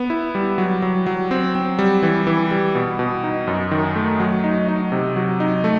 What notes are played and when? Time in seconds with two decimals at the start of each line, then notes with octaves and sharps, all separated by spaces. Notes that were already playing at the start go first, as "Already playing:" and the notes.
Already playing: B3
0.10 E4
0.35 G3
0.58 F#3
0.82 F#3
1.07 F#3
1.31 C4
1.55 C4
1.79 G3
2.03 E3
2.27 E3
2.51 G3
2.75 B2
2.99 B2
3.24 D#4
3.47 F#2
3.71 D#3
3.96 A3
4.20 F#3
4.44 D#4
4.68 D#4
4.92 C3
5.16 F#3
5.40 D#4
5.64 A3